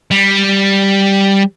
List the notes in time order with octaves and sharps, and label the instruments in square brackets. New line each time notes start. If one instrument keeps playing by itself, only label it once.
[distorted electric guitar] G3